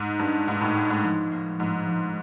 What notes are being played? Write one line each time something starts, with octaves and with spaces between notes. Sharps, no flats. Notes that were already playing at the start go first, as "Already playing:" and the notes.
Already playing: G#2 D#4
G2 A#3
G#2 D#4
A2
D#4
G#2
F3
A#3
G#2 F3
F3